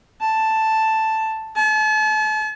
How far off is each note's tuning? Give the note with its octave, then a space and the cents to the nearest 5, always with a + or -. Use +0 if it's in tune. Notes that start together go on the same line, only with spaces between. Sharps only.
A5 +5
A5 -40